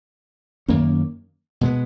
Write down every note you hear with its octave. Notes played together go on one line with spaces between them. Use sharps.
F#2 D#3 A#3 C#4
B2 G#3 B3